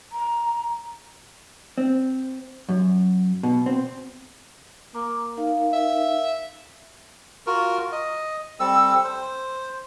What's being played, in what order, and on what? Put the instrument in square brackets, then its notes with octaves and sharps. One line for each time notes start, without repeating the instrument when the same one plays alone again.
[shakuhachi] A#5
[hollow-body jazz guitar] C4
F#2
B2
C4
[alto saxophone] A#3 [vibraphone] A#5 D6
[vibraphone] D#4 A#4 F5
[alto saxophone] E5
[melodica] F4 F#4 A#4
D#5
G3 C4 A4 E6
C5